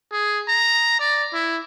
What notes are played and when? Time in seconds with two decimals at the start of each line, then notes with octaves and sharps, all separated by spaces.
0.12 G#4
0.48 A#5
1.00 D5
1.33 E4